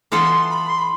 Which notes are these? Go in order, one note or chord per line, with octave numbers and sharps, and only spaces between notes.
E3 B3 F4 A4 C6
B5
C6
B5